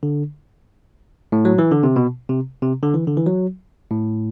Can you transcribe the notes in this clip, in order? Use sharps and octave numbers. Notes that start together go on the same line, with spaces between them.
D3
A2
F#3
E3
D3
C3
B2
C3
C3
D3
E3
D3
E3
F#3
A2